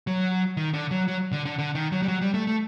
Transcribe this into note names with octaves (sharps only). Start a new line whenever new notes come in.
F#3
D#3
D3
F#3
F#3
D3
D3
D3
D#3
F#3
G3
F#3
G3
A3
A3